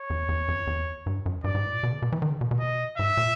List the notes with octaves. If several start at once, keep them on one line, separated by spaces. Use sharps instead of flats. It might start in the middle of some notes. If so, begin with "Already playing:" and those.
Already playing: C#5
E2
E2
F2
E2
G2
F#2
G2 D5
G#2
A2
A#2
B2
C#3
B2
E3
D#3
C#3
B2
B2
D#5
G#2 E5
A#2